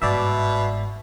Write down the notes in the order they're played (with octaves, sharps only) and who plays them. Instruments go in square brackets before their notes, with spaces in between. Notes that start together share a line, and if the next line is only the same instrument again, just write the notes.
[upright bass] G1 G#2 [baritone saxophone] B2 [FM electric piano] D5 E5